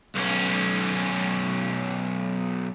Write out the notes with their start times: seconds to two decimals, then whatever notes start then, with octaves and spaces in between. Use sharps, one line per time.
0.16 B1 C#4